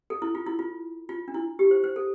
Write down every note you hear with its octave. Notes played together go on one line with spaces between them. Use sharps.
A4
E4
F4
E4
F4
F4
D4
E4
G4
C5
C5
A4